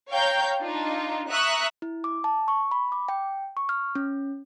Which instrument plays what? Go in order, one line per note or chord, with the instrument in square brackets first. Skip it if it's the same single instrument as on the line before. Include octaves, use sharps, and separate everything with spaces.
[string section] C#5 F5 G5 A#5 G6
D4 D#4 F4
E5 A#5 C#6 D#6 E6 F#6
[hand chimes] E4
D6
A5
C#6
B5
D6
G5
C#6
F6
C#4